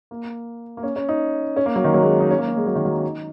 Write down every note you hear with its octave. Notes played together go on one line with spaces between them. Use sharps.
A#3
A#3
C#4
C#4
D#4
C#4
A#3
F#3
D#3
F#3
G#3
D#4
C#4
A#3
C#4
G#3
F#3
D#3
F#3
C#4
D#4